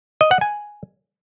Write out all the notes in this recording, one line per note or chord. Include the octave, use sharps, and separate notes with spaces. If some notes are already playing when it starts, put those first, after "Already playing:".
D#5
F#5
G#5